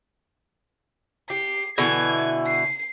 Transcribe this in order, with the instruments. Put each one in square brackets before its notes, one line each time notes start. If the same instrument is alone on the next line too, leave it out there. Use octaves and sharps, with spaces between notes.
[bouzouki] G4 [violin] C7
[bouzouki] B2 D3 E3 [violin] G#6
[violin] C7